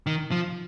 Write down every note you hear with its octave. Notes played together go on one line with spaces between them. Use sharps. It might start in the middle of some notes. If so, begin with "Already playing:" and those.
D#3
F3